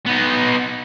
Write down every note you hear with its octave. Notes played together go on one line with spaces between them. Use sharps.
B3 D#4